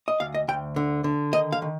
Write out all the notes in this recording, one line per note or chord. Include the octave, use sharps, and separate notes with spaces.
D#5
D2 F5
D#5
D2 G5
D3
D3
D#3 D#5
F5
D#3